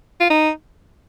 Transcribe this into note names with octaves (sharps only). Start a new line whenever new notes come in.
F4
D#4